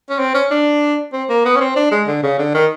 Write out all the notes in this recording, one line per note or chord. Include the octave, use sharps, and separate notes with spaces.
C#4
C4
C#4
D4
C4
A#3
B3
C#4
C4
D4
G#3
D3
C#3
D3
D#3